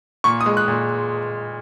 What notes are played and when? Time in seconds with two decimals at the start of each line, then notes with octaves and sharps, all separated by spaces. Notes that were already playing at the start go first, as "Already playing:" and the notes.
0.24 A#2 C#6
0.41 D#6
0.46 G#3
0.57 F#6
0.68 A#2